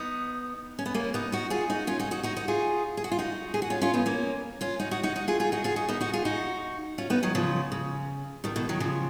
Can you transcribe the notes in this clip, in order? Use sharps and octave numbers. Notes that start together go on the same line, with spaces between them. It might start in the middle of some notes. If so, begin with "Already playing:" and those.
Already playing: B3 D#4
C#4
B3
A#3 C#4
B3 D#4
D#4 F#4
F4 G#4
D#4 F#4
C#4 F4
D#4 F#4
D#4 F#4
D#4 F#4
D#4 F#4
F4 G#4
G#4
F#4
F4
D#4 F#4
G#4
F#4
C#4 F4
C#4 F4
B3 D#4
A#3 C#4
C#4 F4
D#4 F#4
D#4 F#4
D#4 F#4
D#4 F#4
F4 G#4
F4 G#4
D#4 F#4
F4 G#4
D#4 F#4
B3 D#4
D#4 F#4
F4 G#4
D#4 F#4
C#4 F4
B3 D#4
D#3 F#3
C#3 F3
C#3
B2 D#3
B2 D#3
D#3 F#3
C#3 F3